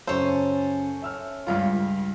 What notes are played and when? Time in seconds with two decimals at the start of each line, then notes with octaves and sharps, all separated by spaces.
0.07 F#2 C#3 C#4 A4 C5
1.02 E5 E6 F6
1.47 C#2 G2 F4